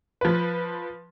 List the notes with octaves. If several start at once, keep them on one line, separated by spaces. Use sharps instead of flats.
F3 B4